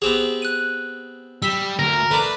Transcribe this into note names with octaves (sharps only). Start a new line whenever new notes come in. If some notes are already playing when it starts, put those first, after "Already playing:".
B3 C4 G4 G#4 E7 F7
F#6 D#7
G3 E6 B6 E7
D2 A#4
A3 D4 B4